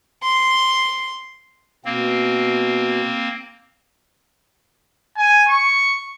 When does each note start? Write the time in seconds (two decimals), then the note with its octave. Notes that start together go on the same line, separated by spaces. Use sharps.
0.23 C6
1.85 B2 A#3 C4
5.17 G#5
5.49 C#6